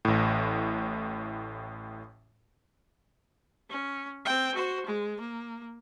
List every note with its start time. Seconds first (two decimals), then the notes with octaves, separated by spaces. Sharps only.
0.05 A1 A2
3.70 C#4
4.25 C4 G5
4.55 F#4 C5
4.86 G#3
5.20 A#3